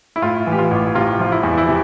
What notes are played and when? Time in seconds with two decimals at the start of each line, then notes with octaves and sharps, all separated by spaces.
0.16 E4
0.22 A2 F4
0.47 E3 G4
0.58 F4
0.71 A1
0.95 C3 F4
1.20 F3 F4
1.32 E4
1.43 E2
1.58 E4
1.68 C3